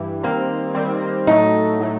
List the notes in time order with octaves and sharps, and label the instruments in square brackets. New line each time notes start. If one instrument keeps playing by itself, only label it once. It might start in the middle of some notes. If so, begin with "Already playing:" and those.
Already playing: [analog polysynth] G2 E3 G3
[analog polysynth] D#3 G3 C4 [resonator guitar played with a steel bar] A#3
[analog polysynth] D#3 G3 C4
[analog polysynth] A2 F#3 A3 [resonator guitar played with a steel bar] D#4
[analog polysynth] A2 F#3 A3